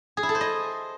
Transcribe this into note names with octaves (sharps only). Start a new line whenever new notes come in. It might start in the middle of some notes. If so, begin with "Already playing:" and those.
G#4
E4
A4
C5
D#5